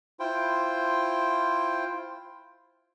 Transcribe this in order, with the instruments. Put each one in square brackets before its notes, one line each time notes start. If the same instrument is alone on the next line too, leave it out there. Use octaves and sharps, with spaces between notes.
[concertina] E4 F4 C5 G5